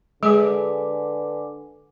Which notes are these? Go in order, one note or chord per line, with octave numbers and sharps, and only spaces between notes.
D3 G#3 G#4 B4 G#5 D6